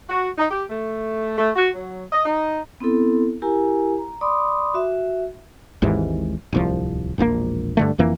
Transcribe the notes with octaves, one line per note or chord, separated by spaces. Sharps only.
F#4
D#4
G4
A3
A3
F#4
F#3
D#5
D#4
B3 C4 E4 A4
E4 G4 A#4 G#5 A#5
A#5
D5 B5 C6 D6 D#6
F#4 E5
G#1 D#2 G#2 E3
D1 C2 F3
E1 A#1 C3 A#3
G2 D3 A3
F1 F2 E3 A#3